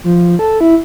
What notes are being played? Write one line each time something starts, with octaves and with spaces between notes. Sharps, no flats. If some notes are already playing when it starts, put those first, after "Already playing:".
F3
A4
E4